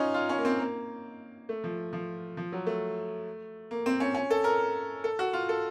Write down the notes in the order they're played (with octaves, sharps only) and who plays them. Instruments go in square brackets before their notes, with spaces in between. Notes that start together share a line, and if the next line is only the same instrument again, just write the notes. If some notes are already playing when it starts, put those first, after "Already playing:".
Already playing: [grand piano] C#4 D#4 F4
F4
C#4
A#3
C4
A#3
A3
F3
F3
F3
F#3
A3
A#3
C4
C#4
C#4
A4
A#4
A4
F#4
F4
A4